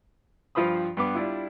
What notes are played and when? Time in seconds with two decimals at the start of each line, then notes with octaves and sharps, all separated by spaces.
0.55 G2 F3 F4 C5 B5 D#6
0.97 G2 B3 D6
1.15 G3 D4 E4 F4